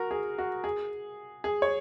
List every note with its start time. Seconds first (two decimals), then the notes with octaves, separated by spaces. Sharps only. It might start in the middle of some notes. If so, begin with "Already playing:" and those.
Already playing: F#4 A#4
0.11 G#4
0.38 F#4
0.64 G#4
1.44 G#4
1.62 C#5